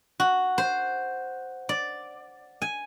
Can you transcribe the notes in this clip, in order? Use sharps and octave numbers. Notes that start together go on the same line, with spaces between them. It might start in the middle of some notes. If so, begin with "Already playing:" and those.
F#4
C5
D5
G#5